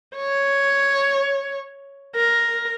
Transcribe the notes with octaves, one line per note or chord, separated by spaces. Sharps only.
C#5
A#4